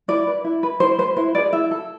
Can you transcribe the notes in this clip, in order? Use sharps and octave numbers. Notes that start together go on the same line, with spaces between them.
E4 D5
B4
E4
B4
E4 C5
B4 C5
E4 C5
G#4 B4 D5
E4 E5
A4